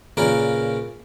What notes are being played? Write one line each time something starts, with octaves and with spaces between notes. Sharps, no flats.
A#2 C#3 C#4 A#4 B4 D5